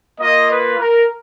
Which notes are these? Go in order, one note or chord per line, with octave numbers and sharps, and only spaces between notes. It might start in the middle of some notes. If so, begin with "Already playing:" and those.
A#3 F4 D#5
B4
A#4